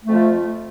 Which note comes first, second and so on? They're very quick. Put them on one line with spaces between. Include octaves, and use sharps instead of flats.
A3 F2 F3